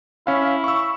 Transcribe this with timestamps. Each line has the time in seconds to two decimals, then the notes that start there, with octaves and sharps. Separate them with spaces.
0.27 C#4 E4 F5
0.64 C#6 E6